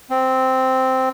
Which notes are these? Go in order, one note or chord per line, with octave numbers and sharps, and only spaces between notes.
C4